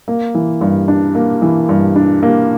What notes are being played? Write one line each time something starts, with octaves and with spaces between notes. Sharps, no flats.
A#3
E3
G2
D4
A#3
E3
G2
D4
A#3